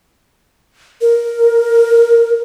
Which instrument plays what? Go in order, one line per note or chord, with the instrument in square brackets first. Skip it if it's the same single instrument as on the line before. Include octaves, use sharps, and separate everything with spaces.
[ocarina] A#4